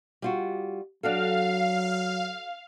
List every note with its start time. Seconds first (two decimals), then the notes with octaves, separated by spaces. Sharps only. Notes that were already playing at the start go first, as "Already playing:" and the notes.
0.22 G3 F4 F#4
1.03 F#3 D4 F#4 A4 F5